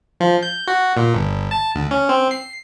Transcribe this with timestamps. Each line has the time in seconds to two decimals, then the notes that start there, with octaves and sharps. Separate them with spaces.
0.20 F3
0.43 G6
0.67 F#4
0.97 A#2
1.15 G1
1.51 A5
1.75 D2
1.91 C#4
2.09 C4
2.31 C7